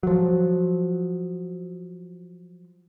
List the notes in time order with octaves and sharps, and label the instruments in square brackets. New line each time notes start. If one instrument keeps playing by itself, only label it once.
[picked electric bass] F3 F#3